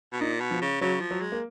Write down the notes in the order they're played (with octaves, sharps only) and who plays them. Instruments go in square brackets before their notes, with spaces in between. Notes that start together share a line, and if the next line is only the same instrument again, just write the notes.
[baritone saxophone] B2
[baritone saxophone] A#2 [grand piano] D#4
[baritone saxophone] B2
[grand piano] F3
[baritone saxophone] C#3
[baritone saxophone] C#3 [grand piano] F#3
[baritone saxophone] F3
[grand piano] F#3
[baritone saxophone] G#3
[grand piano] A#3